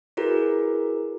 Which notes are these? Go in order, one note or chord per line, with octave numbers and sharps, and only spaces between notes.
E4 F#4 G#4 A#4 B4